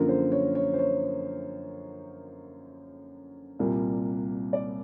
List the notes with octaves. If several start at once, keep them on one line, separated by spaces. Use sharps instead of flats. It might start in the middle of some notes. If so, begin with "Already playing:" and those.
Already playing: F#2 D3 F3 A#3 A#4
C5
C#5
C#5
C5
C#5
C2 A#2 G3 A#3
D5